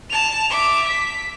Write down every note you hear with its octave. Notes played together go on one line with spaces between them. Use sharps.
A5 F7
E5 D6
B6